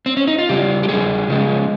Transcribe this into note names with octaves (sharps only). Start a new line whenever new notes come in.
C4
C#4
D#4
F4
C#3 G3 G4
G4
C#3 G3 G#4
C#3 F3 G#3